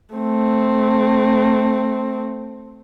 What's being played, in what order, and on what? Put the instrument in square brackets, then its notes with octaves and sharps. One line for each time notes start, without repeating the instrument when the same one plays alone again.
[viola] A3 C4